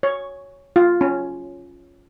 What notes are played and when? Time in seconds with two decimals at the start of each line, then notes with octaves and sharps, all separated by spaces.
0.03 C#5
0.76 F4
1.01 C#4